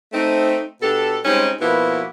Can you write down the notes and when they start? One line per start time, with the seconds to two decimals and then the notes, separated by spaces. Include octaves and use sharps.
0.13 A3 C4 D#4
0.82 B2 D4 G4 A4
1.25 G3 G#3 C4 C#4 D#4
1.61 B2 F3 A#3 B3 E4 F#4